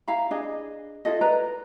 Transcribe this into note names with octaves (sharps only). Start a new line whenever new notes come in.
E4 F5 A#5 B5
D4 G#4 D#5
E4 F4 A4 D#5
A#4 B4 D5 A#5